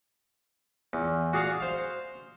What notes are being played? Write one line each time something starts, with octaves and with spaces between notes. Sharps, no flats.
E2
F#4 G#4 D5 F5 F#5
C5 F5